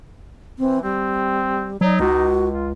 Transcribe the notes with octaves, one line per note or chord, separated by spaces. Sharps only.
E3 C4
G3 C4
F#3 D#4 D5
C#2 F#4
F4